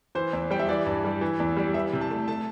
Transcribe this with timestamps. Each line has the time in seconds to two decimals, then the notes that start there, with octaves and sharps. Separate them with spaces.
0.15 E3 C5
0.33 E2
0.51 G3 G5
0.60 E5
0.69 E3 D5
0.86 G2
1.05 G3
1.21 E3
1.40 E2
1.57 G3
1.74 E3 E5
1.93 C3
2.01 A5
2.10 A3
2.28 A3 A5